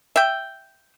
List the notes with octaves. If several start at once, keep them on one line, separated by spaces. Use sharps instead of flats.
E5 G5